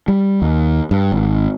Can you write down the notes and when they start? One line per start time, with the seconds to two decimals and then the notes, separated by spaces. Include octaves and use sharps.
0.08 G3
0.42 D#2
0.91 G2
1.12 G#1